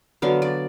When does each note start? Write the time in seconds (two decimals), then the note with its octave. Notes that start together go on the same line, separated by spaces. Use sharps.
0.22 D3 F#3 B3 F5
0.42 D5